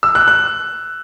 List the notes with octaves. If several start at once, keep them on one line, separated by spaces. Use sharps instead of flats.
E6
F#6
F#6